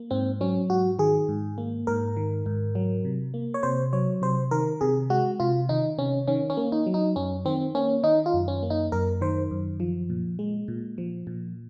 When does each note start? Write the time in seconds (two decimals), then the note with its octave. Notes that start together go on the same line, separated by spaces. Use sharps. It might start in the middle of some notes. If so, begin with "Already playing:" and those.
Already playing: A#3
0.11 G#2 C4
0.41 F#3 C#4
0.70 G#2 F#4
0.99 D#3 G#4
1.29 G#2
1.58 A#3
1.87 G#2 A#4
2.17 D#3
2.46 G#2
2.75 F#3
3.05 C3
3.34 A#3
3.54 C#5
3.63 C3 C5
3.93 F#3 C#5
4.22 C3 C5
4.51 D#3 A#4
4.81 C3 G#4
5.10 G#3 F#4
5.40 C3 F4
5.69 D#3 D#4
5.98 C3 C#4
6.28 D#3 C#4
6.50 C#4
6.57 A#3
6.72 D#4
6.86 F#3
6.94 D#4
7.16 F#2 C#4
7.45 D#3 C4
7.75 A#3 C#4
8.04 D#3 D#4
8.26 F4
8.34 F#2
8.48 C#4
8.63 A#3
8.70 D#4
8.92 F#2 A#4
9.21 D#3 C5
9.51 F#2
9.80 F3
10.10 A#2
10.39 G#3
10.68 A#2
10.98 F3
11.27 A#2